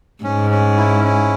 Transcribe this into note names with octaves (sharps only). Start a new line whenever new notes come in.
G#2 C#4
C#4
E4
C#4